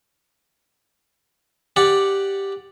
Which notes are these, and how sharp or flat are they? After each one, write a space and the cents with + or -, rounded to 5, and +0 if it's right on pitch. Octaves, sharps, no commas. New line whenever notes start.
G4 +0 D5 +0 F#5 +0